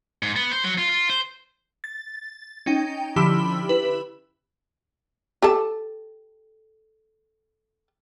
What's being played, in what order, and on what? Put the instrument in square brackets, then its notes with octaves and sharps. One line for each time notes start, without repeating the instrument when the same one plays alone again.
[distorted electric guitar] G#2
B3
C5
F#3
F4
F4
C5
[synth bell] A6
C#4 D#4 G5
D3 F3 E4 G4 B5 E6
E4 B4
[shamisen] G4 A4 A5